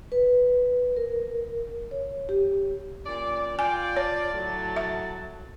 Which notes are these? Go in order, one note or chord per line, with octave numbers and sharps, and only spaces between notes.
B4
A#4
C#5
G4
A#2 C#4 D5
F4 D5 G5 G#5
C#5 A5
A2 F#3
E5